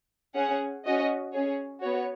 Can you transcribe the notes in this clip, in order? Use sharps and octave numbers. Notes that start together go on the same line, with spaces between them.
C#4 G#4 F#5
C#4 F#4 D#5
C#4 G#4 C#5
B3 F#4 C#5